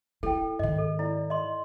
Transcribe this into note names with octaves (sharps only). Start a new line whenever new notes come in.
E4 A4 G5
G#2 D#3 D#5
A4
E4 D5
D#5 C6